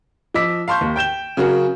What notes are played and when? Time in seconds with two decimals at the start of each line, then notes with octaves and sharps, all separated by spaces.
0.34 F3 D#5 D6 E6 B6
0.68 F5 A5 C6 C#6 G6
0.81 D#2
0.96 G5 G6 E7 G7
1.37 C#3 F#3 C#4 F#4 G#4 A#4